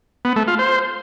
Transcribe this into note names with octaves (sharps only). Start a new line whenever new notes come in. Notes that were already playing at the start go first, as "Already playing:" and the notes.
B3
A3
F4
C5